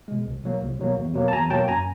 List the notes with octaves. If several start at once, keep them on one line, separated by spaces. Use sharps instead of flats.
B2 G#3
C2
B2 F#3 A#3
C2
B2 F#3 A#3
E2
B2 F#3 A#3
A5
E2 G#5 A#5
B2 F#3 A#3 G5 A5
F#2 G#5 A#5